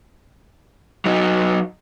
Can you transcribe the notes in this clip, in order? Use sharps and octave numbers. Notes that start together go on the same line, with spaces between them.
F#3 D#4